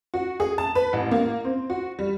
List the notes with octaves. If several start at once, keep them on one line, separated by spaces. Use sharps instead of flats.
F#4
G#4
A5
B4
A1
A#3
C4
F#4
G3